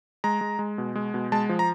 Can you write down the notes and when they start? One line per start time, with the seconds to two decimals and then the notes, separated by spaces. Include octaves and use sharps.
0.24 G#3 A#5
0.41 G#3
0.59 G#3
0.78 B2
0.95 G#3
1.14 B2
1.32 G#3 A5
1.49 F3
1.59 A#5